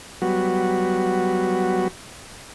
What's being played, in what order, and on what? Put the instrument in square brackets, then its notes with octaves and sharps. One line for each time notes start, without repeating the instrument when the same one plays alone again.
[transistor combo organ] F#3 G3 B3 F#4